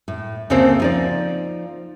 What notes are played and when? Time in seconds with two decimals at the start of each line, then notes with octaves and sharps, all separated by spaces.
0.08 A2
0.50 D2 C#3 A3 A#3 C4 C5
0.80 F3 D#4 D5